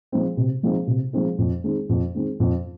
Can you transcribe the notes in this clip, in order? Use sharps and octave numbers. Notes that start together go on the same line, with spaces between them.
F3 G#3 C4 D#4
C3
F3 G#3 C4 D#4
C3
F3 G#3 C4 D#4
F2
D#3 G#3 C4
F2
D#3 G#3 C4
F2